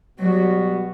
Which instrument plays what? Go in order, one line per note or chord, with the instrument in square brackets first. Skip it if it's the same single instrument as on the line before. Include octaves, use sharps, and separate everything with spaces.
[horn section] B2 G3 B3 F#4 [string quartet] F#3